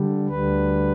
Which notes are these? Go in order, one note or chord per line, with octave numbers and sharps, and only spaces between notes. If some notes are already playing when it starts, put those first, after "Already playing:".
Already playing: D3 G3
D2 D3 G3 B4